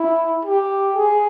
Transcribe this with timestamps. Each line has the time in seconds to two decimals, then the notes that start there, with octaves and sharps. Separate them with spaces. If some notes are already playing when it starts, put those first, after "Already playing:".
Already playing: E4
0.45 G4
0.95 G#4